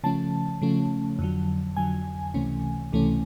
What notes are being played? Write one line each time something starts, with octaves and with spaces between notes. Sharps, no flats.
C#3 F3 A3 C#4 A5
C#3 F3 A3 C#4
F2 D3 F#3
F2 D3 F#3 G#5
C#2 C3 E3 A3 C#4
C#2 C3 E3 A3 C#4